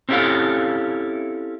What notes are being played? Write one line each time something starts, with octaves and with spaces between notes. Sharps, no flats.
C4 C#4 E4 G4 A4 F5